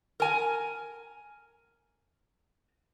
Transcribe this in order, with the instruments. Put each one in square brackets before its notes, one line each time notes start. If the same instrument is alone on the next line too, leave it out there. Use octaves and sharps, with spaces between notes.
[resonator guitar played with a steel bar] A#4 G#5